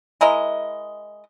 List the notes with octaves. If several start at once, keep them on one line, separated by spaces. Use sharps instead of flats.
G#3 E4 A#4 D#5